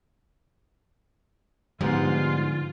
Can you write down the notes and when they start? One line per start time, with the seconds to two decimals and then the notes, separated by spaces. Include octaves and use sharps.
1.81 G#2 D3 F3 G3 G#3 B3 F4